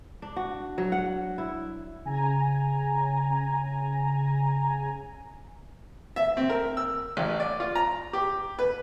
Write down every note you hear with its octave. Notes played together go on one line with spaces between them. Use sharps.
D4
F#4
F#3
F#5
E4
C#3 G#5 A#5
E5
C4
A#4
E6
A1
D5
F4
A#5
G4
B4